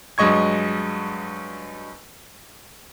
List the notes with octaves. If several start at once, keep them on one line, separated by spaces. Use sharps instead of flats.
G2 F#3 G#3 D#5 C#6 G#6